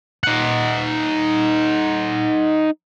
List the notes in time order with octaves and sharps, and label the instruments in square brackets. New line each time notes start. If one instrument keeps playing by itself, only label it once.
[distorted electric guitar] D#4 F#5